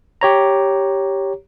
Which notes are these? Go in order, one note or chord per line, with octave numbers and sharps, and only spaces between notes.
G4 C#5 A#5